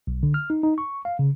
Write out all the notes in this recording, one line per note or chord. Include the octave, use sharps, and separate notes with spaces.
B1
D3
F6
D#4
D#4
C#6
F5
C#3